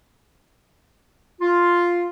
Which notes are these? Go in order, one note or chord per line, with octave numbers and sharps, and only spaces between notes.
F4